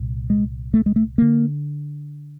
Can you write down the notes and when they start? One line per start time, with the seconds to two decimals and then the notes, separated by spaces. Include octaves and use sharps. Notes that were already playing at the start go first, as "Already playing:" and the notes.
Already playing: C2 A#2
0.30 G#3
0.74 A3
0.86 G#3
0.96 A3
1.18 D3 A#3